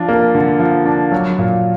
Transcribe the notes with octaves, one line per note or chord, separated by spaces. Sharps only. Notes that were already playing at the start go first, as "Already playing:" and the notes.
Already playing: F3 D4
A#3
D3
F3
D4
F#3
A#2